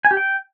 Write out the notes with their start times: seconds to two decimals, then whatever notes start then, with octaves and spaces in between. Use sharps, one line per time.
0.05 G#5
0.11 G4
0.17 G5